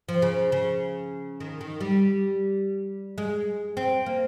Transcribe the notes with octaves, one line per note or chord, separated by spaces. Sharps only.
F3
C#3
C#3
D#3
D#3
G3
G#3
C4
A#3